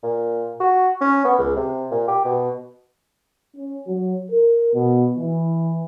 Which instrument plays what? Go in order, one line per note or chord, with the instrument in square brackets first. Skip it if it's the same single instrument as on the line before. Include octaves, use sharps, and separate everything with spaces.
[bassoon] A#2
F#4
C#4
B3
C#2
C3
A#2
G4
B2
[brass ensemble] C#4
F#3
A#4
B2
E3